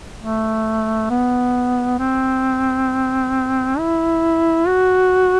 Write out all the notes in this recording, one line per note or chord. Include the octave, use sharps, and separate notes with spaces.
A3
B3
C4
E4
F#4